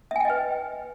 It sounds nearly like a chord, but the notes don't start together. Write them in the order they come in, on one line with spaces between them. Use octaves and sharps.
E5 G#5 G5 D#5 B4